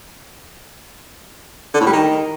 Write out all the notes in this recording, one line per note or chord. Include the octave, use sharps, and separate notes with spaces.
D3
A2
G3
D#3